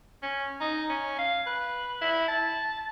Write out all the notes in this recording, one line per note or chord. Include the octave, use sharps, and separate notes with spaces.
C#4
D#4
C#4
F5
B4
E4
A5